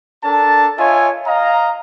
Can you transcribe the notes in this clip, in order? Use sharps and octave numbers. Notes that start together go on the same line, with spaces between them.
D4 A4 A#4 A5
F4 C#5 D#5 E5 G#5
D#5 F5 A#5